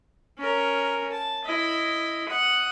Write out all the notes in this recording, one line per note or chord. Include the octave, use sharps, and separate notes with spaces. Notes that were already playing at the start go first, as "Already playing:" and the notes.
C#4 A#4
A5
E4 D#5
F#5 D#6